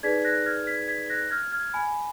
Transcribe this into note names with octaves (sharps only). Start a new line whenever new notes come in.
D#4 G#4 B4 D5 G#6 B6
F#6 A#6
F6 G#6
G#6 B6
G#6 B6
F#6 A#6
F6 G#6
F6 G#6
G#5 B5